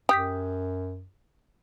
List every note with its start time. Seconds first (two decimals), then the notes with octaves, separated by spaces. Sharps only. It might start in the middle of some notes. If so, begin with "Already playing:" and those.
0.09 F#2 G4 D#6 G6 B6